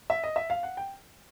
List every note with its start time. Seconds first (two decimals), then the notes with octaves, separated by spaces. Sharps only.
0.10 E5
0.24 D#5
0.36 E5
0.50 F5
0.63 F#5
0.77 G5